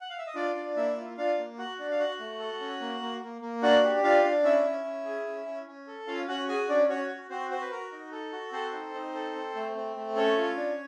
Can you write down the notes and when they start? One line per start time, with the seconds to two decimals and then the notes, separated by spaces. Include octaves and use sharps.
0.01 F#5
0.10 F5
0.18 E5
0.27 D#5
0.35 D4 F4 D5
0.55 D4
0.76 A#3 E4 E5
0.96 F4
1.17 D4 F4 F5
1.38 A#3
1.58 F#4 F#5
1.79 D4
1.91 F5
1.99 F#4 F#5
2.19 A3
2.39 A4
2.60 C#4
2.81 A#3
3.01 A#3
3.22 A#3
3.41 A#3
3.62 D4 F#4 F#5
3.83 G4
4.03 D4 F4 F5
4.24 D4
4.44 C#4 E4 E5
4.65 C#4
4.84 C#4
5.05 G#4
5.26 C#4
5.46 C#4
5.67 C#4
5.87 A4
6.07 C#4 F4 F5
6.28 C#4 F#4 F#5
6.48 F#4 G#4 G#5
6.68 C#4 D4 D5
6.89 C#4 F#4 C#5
7.09 F#4
7.30 C4 F#4 C5
7.50 F#4 C5
7.61 B4
7.71 F#4 A#4
7.92 D#4
8.12 A4
8.32 F#4
8.52 C4 A4 C5
8.73 D#4
8.94 D#4
9.14 A4
9.35 C4
9.55 A3
9.76 C4
9.96 A3
10.16 C#4 A4 C#5
10.37 F4
10.57 D4